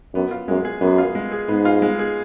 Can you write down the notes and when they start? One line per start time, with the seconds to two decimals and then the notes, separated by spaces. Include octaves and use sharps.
0.14 F#2 B3
0.31 F4
0.48 F#2 G#3
0.65 G#4
0.81 F#2 B3
0.98 F4
1.15 G#3
1.32 G#4
1.48 G#2 B3
1.65 F4
1.82 G#3
1.99 G#4